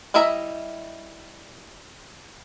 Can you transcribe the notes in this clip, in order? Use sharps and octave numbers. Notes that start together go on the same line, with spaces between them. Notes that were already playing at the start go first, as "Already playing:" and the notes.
G3 E4 D#5 E5 A#5